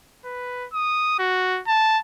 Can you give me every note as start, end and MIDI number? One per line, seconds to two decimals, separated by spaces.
0.25 0.67 71
0.73 1.16 87
1.19 1.61 66
1.67 1.98 81